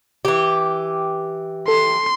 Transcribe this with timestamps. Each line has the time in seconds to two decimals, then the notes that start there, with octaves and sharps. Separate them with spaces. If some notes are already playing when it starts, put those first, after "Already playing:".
0.25 E3 G4
1.68 A4 C6